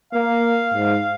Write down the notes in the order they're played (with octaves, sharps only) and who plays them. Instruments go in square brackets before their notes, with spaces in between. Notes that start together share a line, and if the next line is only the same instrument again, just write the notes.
[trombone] A#3 [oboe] F5
[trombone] G#2